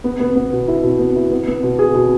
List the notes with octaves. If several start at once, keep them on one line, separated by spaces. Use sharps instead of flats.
B3
B3
B3
B2
E4
B2
B3
E4
B3
B3
B2
G#4
B2